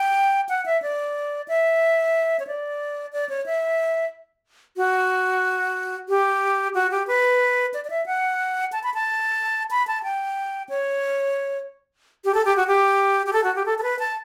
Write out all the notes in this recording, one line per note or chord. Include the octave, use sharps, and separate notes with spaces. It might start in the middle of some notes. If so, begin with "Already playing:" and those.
Already playing: G5
F#5
E5
D5
E5
C#5
D5
D5
C#5
E5
F#4
G4
F#4
G4
B4
D5
D5
E5
F#5
A5
B5
A5
B5
A5
G5
C#5
G4
A4
G4
F#4
G4
G4
A4
F#4
G4
A4
A4
B4
A5